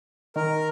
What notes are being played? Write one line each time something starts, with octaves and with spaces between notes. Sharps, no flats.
D#3 A#4